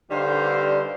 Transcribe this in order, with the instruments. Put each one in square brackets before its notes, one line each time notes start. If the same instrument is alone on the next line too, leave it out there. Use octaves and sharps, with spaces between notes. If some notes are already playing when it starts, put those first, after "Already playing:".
[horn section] G2 D3 G3 D#4 C5 F5